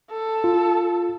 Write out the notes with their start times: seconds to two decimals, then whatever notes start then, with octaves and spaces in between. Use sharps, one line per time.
0.11 A4
0.44 F4